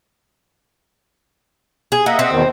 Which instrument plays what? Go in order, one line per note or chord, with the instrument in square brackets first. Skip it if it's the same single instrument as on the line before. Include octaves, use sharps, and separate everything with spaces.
[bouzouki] G#4
[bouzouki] A#3 [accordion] D#5 E5 F#5
[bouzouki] C4
[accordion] E2 B2 D#3